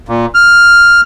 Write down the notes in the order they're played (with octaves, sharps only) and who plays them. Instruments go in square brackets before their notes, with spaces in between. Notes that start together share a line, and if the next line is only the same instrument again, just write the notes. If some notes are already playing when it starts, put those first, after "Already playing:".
[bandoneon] A#2
F6